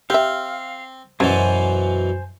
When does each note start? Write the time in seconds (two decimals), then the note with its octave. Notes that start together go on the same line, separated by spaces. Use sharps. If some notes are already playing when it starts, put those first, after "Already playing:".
0.10 C4 G4 E5 F5
1.20 F#2 B2 E3 C#4 C5 G#5 A5